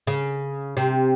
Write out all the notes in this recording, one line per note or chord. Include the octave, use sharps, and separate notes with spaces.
C#3
C3